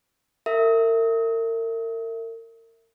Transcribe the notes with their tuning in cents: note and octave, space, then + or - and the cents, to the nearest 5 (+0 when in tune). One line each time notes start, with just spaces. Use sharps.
A#4 -40 E5 +0